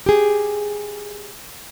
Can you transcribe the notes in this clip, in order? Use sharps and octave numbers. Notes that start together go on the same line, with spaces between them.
G4 G#4